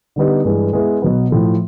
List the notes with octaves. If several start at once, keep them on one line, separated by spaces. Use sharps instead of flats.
D3 G3 B3 D#4 G4
G2 E3 G#3
G#3 B3 E4 G#4
B2 F#3 B3
A2 F3 A3